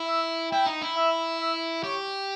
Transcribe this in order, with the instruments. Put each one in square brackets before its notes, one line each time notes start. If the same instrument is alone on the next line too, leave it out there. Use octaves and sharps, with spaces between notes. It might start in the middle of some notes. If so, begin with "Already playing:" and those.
Already playing: [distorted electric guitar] E4
[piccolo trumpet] E5
[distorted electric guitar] E4 [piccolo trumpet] G5
[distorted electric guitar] D#4
E4
[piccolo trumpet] E5
E5
[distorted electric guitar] G4 [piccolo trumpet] C#5